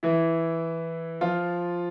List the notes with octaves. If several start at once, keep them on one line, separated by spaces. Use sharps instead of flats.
E3 E4
F3 F4